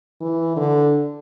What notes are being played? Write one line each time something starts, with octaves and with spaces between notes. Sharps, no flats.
E3
D3